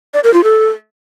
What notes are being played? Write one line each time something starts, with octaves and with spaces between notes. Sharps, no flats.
D5
A#4
F4
A4